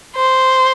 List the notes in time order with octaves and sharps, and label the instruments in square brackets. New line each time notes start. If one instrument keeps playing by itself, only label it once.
[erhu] C5